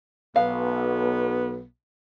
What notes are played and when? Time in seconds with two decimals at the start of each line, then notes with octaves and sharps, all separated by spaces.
0.36 B1 B3 F5